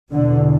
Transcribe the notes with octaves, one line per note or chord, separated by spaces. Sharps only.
E2 B2 D3